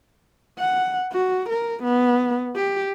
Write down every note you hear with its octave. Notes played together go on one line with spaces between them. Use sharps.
F#5
F#4
A#4
B3
G4